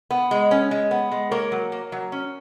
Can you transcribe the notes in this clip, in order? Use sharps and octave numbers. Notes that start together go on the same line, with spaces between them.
B3
G#3
C#4
G#3
B3
G#3
A#3 A#4 C#5
F#3
A#3
F#3
C#4